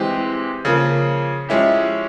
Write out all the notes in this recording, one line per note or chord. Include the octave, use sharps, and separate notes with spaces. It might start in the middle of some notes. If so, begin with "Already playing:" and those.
Already playing: E3 G#3 C4 G4
C#3 F3 A#3
F3 G#3 C#4 E4 G4